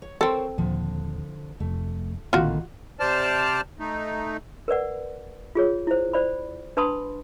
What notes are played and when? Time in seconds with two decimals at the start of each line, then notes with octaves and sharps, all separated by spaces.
0.02 C#5
0.21 C4 A4 A#4 C5 C#5
0.58 D#2 A#2 D3 F3
1.60 F1 F2 A3
2.33 A#1 A2 D3 D#3 A#3 C4 F4 F#4
3.00 C3 C5 D5 A5 F6
3.79 A3 D#4
4.68 A#4 B4 D5 F#5
5.55 F4 G#4 C#5
5.87 E4 C5
6.13 C5 D5 B5
6.77 D4 B4 A5 B5 C6 D#6